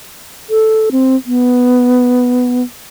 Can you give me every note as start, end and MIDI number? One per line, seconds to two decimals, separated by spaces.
0.50 0.90 69
0.92 1.16 60
1.26 2.62 59